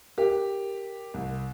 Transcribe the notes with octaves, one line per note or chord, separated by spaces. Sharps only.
G4 A#4
C2